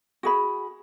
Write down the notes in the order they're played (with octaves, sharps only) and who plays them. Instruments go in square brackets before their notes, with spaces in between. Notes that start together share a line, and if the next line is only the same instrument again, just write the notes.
[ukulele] F#4 G#4 B5